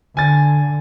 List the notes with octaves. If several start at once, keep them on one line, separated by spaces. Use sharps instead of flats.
D3 G#5 A6